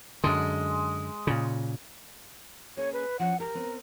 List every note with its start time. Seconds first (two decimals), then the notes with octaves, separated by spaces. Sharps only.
0.24 F#2 D3 G#3
1.27 A#2 C#3
2.77 A#3 C#4 G#4 C#5
2.93 B4
3.19 F3 C#4 F#5
3.40 G4 A#4
3.55 B3 C4